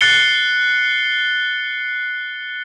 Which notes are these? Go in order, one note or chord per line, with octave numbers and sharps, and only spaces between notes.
F#6 A6 C7 C#7 G7